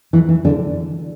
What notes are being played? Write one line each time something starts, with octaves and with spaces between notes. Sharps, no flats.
E3
E3
D3